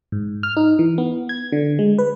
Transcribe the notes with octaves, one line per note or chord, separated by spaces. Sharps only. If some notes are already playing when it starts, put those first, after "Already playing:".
G#2
F6
D#4
E3
B3
G#6
D3
G#3
B4